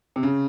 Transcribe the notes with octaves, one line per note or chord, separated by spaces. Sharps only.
C3
C#3